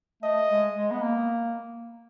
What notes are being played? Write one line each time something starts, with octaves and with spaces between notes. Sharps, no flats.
A3 D#5
G#3
G#3
B3
A#3